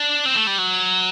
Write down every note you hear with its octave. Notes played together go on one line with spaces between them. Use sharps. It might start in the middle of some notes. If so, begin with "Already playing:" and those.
Already playing: D4
C4
A3
G3
F#3